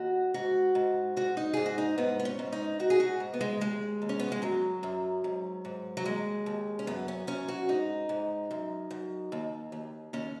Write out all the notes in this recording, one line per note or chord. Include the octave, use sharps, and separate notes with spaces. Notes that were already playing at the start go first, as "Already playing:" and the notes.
Already playing: D#2 F#4
G#2 F#4
G#2
G#2 F#4
D#4
G#2 G#4
F#4
D#4
G#2 B3
B3
C#4
G#2
D#4
G#2 F#4
G#4
F#4
G#2
B3
G#3
D#2 G#3
D#2
C#4
B3
G#3
F#2 F#3
F#2
G#2
G#2
F#3
D#2 G#3
D#2
C#4
F#2 B3
C#4
F#2 C#4
F#4
G#2 D#4
G#2
F#2
F#2
D#2
D#2
D#2 C#4